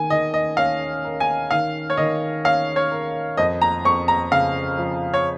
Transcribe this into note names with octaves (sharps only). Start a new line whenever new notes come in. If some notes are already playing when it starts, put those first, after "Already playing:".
Already playing: D#3 G#5
D#3 D#5
D#5
C#4 F5
A#4
G#5
D#3 F5
C#5
D#3 D#5
C#4 F5
C#5
A#4
F2 D#5
A#5
F2 C#6
A#5
C#3 F5
F3
C#5